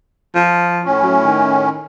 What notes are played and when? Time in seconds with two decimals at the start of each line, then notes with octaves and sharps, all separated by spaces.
0.35 F3
0.85 A2 C#4
1.03 F#3
1.24 D#3